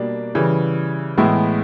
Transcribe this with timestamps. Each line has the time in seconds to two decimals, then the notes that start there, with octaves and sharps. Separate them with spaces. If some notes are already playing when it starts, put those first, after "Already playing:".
Already playing: B2 G3 A#3 D4
0.35 C#3 E3 G3
1.17 A2 E3 G#3 B3 E4